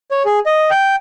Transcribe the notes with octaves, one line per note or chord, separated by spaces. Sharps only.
C#5
G#4
D#5
G5